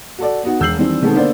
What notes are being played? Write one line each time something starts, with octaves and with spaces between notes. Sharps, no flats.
F#4 A4 D5
B3 D#4 F#4
E1 E6 G6 C7 F#7
D#3 E3 G3 C4 D4
B2 D#3 G#3 B3 C4 A4
D3 A#3 B3 C5 D5